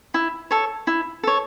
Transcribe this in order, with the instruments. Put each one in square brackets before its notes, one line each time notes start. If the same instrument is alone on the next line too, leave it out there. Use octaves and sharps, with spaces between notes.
[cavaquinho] E4
A4 C#5
E4
A4 C#5